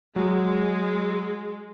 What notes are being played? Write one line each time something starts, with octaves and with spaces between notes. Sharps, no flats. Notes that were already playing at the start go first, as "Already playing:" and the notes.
F#3 G#3